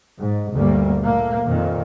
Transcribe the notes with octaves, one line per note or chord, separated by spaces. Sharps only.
G#2
G1 D2 G3 A#3
A#2 A3 A#3
F2 A#2 D#3